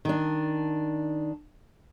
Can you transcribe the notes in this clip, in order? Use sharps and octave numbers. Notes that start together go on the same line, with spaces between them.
D#3 D4